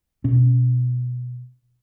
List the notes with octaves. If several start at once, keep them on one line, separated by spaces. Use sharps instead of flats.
B2 C#4